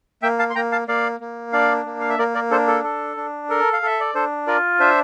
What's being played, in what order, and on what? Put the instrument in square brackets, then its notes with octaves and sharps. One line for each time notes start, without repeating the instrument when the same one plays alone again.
[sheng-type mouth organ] A#3 E5 G5
F5 A5
C6
A#3 G5 A#5
F5 A5
A#3 D5 F5
A#3
D4 D5 F5
A#3
F5
E5
A#3 A#4 D5
A#4 D5
D4 A4 C5
A4
A4
D4
A4 A#4
F5
A4 E5
D5
D4 A4 C5
F4 A#4 D5
D4 C5 E5